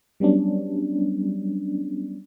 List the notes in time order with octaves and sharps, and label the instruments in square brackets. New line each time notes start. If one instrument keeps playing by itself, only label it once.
[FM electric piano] F#3 G3 B3 C#4 D4